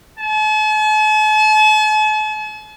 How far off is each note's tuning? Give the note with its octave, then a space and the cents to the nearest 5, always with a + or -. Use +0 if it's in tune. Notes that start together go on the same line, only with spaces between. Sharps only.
A5 -45